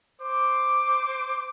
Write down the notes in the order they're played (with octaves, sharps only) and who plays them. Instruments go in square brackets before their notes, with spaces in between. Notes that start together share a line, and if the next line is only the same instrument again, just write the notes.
[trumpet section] C5 D6